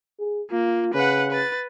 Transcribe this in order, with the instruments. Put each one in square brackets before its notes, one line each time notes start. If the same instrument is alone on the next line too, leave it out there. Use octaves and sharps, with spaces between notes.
[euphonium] G#4
[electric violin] A#3 [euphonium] F4
[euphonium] C#3 [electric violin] B4 F#5
[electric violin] B4 A6